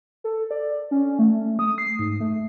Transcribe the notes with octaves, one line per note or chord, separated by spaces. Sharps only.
A4
D5
C#4
A3
D#6
C7
G#2
A3